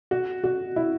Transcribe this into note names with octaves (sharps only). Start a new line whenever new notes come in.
F#4
F#4
E4